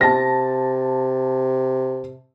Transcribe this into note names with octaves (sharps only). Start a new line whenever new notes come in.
C3 A5 A#6